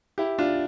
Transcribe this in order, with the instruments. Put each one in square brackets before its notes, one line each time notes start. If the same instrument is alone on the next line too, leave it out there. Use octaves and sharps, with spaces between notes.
[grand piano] E4 G4
D4 F4